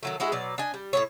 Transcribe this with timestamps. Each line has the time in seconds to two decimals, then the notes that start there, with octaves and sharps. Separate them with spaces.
0.03 D#3 F#3 A3
0.20 G#3 E4 F#4 G#4
0.32 B2 F#3 D5
0.58 D4 D#5 G#5
0.74 G3
0.93 A2 C3 C#5